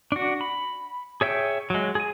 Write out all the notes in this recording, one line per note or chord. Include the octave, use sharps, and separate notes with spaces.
D4 F#4
B5
G#4 C#5 E5 G5
F#3 G#3
G#4 G#5